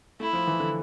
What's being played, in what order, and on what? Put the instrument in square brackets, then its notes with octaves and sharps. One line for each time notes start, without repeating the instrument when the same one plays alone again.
[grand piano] A3 [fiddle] E4
[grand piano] F3
E3
D3